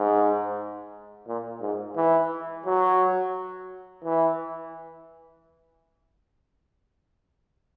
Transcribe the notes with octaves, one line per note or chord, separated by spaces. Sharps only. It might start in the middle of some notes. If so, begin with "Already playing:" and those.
Already playing: G#2
A#2
G#2
E3
F#3
E3